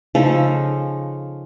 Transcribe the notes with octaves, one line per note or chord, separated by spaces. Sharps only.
C#3 F3 D#4 A4